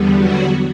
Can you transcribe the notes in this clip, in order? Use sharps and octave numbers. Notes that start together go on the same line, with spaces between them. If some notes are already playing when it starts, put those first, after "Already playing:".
Already playing: E2 D3 G3 B3
F#3 F#4